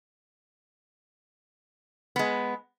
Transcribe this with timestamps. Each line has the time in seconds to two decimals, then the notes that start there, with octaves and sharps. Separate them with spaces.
2.16 G#3 B3